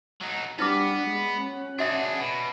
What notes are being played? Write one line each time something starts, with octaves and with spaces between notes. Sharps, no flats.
F#3 D#4
G3 B3 D4 E4 B4 D6
G#3
C#4 F#5
D4 F#4 G#4 E5 A5
B2